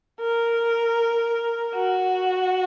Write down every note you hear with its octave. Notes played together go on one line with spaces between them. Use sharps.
A#4
F#4